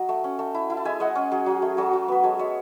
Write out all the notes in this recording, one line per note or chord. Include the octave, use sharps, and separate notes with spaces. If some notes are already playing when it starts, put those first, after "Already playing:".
Already playing: F#3 D#5 F#5
A3
C#4
A3
E4
E4
A5
G#3 E5 G#5
G#3 D#5 F#5
C#4
F#3 G#4
F#3
A3
F#3 F#4 A4
F#3
B3 B4
G#3 A4 C#5
G#3 C#5 E5